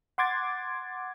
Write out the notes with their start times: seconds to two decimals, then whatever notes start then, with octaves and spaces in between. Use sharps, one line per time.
0.18 F#5 C6 D6 G#6 A6